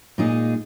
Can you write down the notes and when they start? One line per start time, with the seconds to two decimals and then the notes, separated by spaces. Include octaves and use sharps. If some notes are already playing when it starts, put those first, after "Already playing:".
0.18 A#2 G#3 D#4 G#4